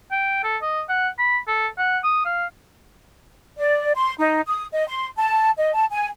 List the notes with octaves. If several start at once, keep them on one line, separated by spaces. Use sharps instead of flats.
G5
A4
D#5
F#5
B5
A4
F#5
D#6
F5
D5
C6
D#4
D#6
D#5
C6
A5
D#5
A5
G#5